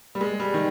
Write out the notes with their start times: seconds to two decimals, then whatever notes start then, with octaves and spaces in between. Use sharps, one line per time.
0.15 G3
0.21 G#3
0.40 G3
0.54 D#3